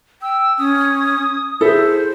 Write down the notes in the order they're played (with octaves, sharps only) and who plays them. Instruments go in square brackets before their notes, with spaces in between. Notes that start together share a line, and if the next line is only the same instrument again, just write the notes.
[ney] G5 [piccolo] E6
[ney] C#4 [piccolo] D#6
[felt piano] E4 G#4 [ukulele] A4 E5 [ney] C5